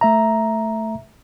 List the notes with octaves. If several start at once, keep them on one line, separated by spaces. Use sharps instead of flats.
A3 E5 A#5